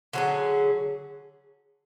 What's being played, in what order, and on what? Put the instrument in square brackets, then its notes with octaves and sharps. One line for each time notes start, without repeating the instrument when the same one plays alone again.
[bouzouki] D3 F#3 C#4 G#4